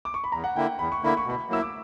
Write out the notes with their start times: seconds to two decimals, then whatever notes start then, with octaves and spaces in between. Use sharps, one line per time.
0.05 D6
0.14 C#6
0.24 B5
0.32 E2 A#5
0.44 F#5
0.56 D3 A#3 E4 G5
0.78 E2 B5
0.92 C#6
1.03 D3 A#3 E4 B5
1.17 C#6
1.25 B2 B5
1.49 F#3 A#3 E4 E6
1.62 D6